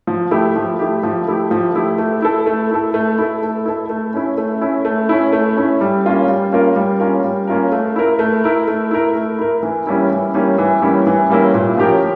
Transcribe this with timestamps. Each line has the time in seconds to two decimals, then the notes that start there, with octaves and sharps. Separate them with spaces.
0.07 F3
0.31 A3 E4 G4
0.56 F3
0.79 A3 E4 G4
1.03 F3
1.28 A3 E4 G4
1.51 F3
1.75 A3 E4 G4
1.98 A3
2.22 E4 A4
2.46 A3
2.71 E4 A4
2.94 A3
3.19 E4 A4
3.43 A3
3.65 E4 A4
3.90 A3
4.14 C#4 E4
4.38 A3
4.61 C#4 E4
4.85 A3
5.09 C#4 E4
5.33 A3
5.57 C#4 E4
5.81 G3
6.04 A#3 C#4 F4 A#4
6.28 G3
6.52 A#3 C#4 F4 A#4
6.76 G3
7.00 A#3 C#4 F4 A#4
7.24 G3
7.47 A#3 C#4 F4 A#4
7.72 A3
7.96 E4 A#4
8.19 A3
8.44 E4 A#4
8.68 A3
8.91 E4 A#4
9.15 A3
9.39 E4 A#4
9.63 E3
9.87 G3 A#3 C#4 E4
10.11 E3
10.34 G3 A#3 C#4 E4
10.58 E3
10.82 G3 A#3 C#4 E4
11.07 E3
11.30 G3 A#3 C#4 E4
11.54 A#2
11.77 F3 C#4 G4 A#4